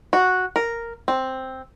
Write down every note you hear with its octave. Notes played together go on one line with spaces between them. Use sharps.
F#4
A#4
C4